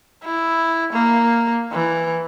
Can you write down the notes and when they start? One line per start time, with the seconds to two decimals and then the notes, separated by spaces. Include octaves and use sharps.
0.24 E4
0.93 A#3
1.72 E3